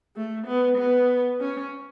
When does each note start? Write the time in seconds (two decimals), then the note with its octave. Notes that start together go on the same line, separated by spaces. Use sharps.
0.16 A3
0.47 B3
0.77 B3
1.40 C#4